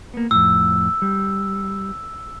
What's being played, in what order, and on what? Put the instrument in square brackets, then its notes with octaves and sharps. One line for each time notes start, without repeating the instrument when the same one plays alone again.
[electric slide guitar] A#3 B3
[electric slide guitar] F2 A2 [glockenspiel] E6
[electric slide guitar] G3